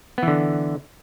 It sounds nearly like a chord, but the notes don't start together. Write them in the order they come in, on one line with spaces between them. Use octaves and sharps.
B3 E3 D3